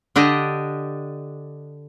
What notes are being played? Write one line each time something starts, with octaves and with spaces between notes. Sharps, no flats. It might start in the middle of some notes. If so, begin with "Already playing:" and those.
D3 D4 G4 D#5